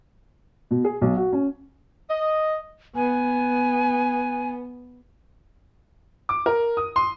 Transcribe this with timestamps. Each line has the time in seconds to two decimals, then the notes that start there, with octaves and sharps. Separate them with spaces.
0.71 B2
0.84 G#4
1.01 B1
1.16 F#4
1.33 C#4
2.09 D#5
2.95 B3 G#5
6.29 D6
6.46 A#4
6.77 D#6
6.96 C6